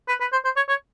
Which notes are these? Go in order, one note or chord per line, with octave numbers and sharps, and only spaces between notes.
B4
B4
C5
C5
C#5
C#5